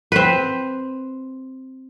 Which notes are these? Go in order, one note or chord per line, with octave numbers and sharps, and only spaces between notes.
C4 B4